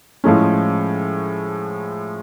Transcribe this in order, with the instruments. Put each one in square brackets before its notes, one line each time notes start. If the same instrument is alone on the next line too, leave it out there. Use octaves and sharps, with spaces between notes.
[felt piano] A2 F3 G#3 C#4